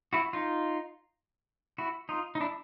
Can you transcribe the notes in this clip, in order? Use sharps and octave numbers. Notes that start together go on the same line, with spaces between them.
E4 F#4
D#4 F4
E4 F#4
D#4 F4
D#4
D4 E4